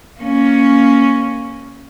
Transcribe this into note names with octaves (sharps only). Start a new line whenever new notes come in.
A#3 C#4